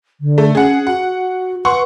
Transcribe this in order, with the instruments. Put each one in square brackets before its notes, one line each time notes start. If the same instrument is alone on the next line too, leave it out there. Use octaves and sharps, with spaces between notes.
[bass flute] D3
[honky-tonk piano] A3
[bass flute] C#4 [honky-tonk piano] G#4 F#5
[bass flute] F#4 [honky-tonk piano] F#5
[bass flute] B4 [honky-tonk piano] F#5 C6 C#6